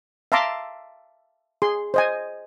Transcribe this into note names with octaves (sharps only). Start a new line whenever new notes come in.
E5 F5 A5 A#5 C6 D6
G#4 C6
C5 D#5 G#5